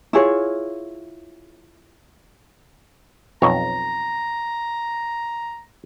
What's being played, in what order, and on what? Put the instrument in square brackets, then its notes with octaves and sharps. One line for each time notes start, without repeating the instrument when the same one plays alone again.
[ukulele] E4 F4 G#4 C#5
[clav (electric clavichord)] B1 F2 C#5 [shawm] A#5